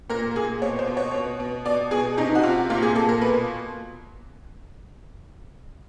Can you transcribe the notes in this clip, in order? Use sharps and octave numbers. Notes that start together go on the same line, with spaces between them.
A#2 A#4
A#2 G#4
B2 C#5
C5
B2
C#5
B2
B2
B2 D5
B2 G#4
C3 D#4
F#4
C3 F4
A#2 F4
G#4
A#2 A4
A#4
B2 B4